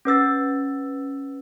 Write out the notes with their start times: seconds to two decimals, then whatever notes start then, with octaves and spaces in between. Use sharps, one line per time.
0.05 C#4 B4 E6 A6